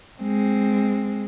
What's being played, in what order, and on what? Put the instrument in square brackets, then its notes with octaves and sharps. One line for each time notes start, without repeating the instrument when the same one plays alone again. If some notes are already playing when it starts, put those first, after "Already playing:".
[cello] G#3 C4